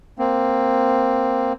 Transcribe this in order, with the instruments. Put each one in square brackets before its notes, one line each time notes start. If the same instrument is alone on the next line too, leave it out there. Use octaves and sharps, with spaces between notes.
[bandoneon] A#3 C4